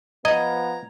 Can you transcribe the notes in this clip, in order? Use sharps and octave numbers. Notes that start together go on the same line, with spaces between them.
F3 B3 D#5 A#5 G#6